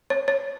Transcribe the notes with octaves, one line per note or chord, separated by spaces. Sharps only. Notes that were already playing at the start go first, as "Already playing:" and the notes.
C#5
C#5